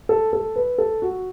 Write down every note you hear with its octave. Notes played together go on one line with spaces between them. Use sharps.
A4
A4
B4
A4
F#4